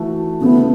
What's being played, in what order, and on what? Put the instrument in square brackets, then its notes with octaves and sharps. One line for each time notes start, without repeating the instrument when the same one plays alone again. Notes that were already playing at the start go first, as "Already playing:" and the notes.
Already playing: [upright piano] E3 A3 F#4 A4
[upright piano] C#3 A3 E4 A4 [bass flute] B3